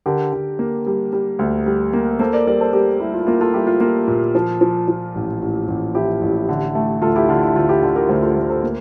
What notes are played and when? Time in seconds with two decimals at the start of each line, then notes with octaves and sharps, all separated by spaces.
0.06 D3 G4 A#4
0.33 D3
0.59 A#3
0.87 G3
1.13 G3
1.39 D2
1.66 G3
1.93 A#3
2.19 A#3 A4 C5
2.33 A#4 D5
2.47 G3 A#4 D5
2.60 A4 C5
2.73 G3 G4 A#4
3.00 G3 E4
3.14 F4
3.21 E4
3.27 A#3 F4
3.41 F4 A4
3.54 G3 E4 G4
3.67 F4
3.80 A#3 F4
4.08 A#2
4.35 F3
4.61 F3
4.88 F3
5.15 A1
5.42 A1
5.68 A1
5.95 F3 E4 G4
6.21 A1
6.49 D3
6.75 A3
7.02 D2 F4 A4
7.16 E4 G4
7.29 D3 F4
7.42 E4
7.56 D2 F4
7.69 E4 G4
7.83 D3
7.96 G4 A#4
8.09 D2 A4 C5
8.23 F4 A4
8.36 D2
8.49 A4 C5
8.63 A#3